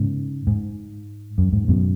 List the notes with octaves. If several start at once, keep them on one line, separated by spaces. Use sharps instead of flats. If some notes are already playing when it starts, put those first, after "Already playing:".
Already playing: G#2 C#3
G#2
F#2
G#2
F#2 B2